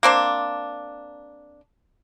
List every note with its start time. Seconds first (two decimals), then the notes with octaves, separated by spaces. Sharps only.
0.03 A#3 C4 D4